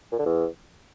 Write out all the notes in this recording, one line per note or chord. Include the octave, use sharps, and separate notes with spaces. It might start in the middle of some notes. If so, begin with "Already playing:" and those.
A#2
D3
E2